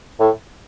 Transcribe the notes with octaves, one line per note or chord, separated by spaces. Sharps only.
A2